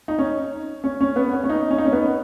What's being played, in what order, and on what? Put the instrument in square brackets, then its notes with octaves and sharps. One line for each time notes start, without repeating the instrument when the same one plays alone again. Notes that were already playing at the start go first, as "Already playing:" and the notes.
[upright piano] D#4
C#4
C#4
C#4
B3
C#4
C#4
D#4
C#4
D#4
C#4
B3